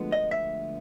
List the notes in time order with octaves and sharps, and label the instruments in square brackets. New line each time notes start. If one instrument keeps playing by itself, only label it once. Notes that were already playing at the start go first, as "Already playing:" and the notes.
Already playing: [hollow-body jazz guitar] D2 D3 F3 G#3 B3
D#5
E5